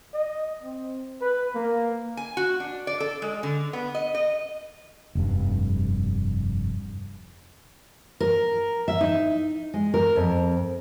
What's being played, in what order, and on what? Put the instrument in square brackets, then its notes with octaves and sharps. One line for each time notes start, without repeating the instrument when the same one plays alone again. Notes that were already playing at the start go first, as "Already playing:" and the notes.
[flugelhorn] D#5
C4
B4
A#3
[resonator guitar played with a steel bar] G#5
F#4
D4
D5
A4
G#3
D3
B3
D#5
D#5
[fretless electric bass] F1 G2
[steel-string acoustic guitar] A#4
E5
D#4
G#3
A#4
F2